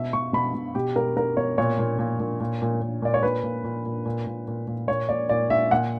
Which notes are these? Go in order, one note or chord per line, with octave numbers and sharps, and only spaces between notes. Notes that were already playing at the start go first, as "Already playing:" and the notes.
Already playing: B2 E5
B2 C#6
B2 B5
B2
B2 G4
B2 A#4
B2 A#4
B2 C#5
A#2 C#5
A#2
A#2
A#2
A#2
A#2
A#2
A#2 D5
C#5
A#2 B4
A#2
A#2
A#2
A#2
A#2
A#2
A#2
A#2 C#5
A#2 D5
A#2 D5
A#2 E5
A#2 F#5